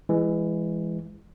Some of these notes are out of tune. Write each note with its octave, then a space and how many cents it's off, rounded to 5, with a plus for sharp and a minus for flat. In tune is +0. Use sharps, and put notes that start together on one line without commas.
E3 +20 G#3 -10